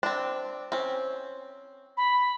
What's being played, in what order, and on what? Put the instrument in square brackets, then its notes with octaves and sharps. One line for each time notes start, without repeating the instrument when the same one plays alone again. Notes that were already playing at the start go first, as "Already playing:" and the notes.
[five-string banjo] C4 D4
C4 C#4
[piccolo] B5